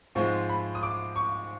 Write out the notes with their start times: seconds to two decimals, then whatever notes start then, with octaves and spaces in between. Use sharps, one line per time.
0.15 G#2 F3 G#3 C4 C#6
0.49 B5
0.75 D#6
0.83 D6
1.16 C#6